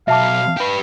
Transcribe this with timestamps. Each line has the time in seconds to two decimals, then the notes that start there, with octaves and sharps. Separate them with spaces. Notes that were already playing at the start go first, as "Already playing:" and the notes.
0.08 B1 E5 F5 A5 D6
0.57 G4 B4